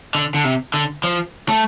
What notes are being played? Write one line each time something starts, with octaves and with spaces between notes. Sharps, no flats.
D3
D3
C3
D3
F3
A3